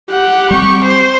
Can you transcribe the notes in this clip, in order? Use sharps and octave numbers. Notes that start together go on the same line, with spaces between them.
G4 F#5
G3 C4 C#6
C5